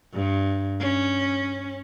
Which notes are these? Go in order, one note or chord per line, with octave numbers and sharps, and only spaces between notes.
G2
C#4